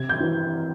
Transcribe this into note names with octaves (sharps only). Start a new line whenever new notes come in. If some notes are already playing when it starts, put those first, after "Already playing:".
Already playing: C3 G#6
G6
E3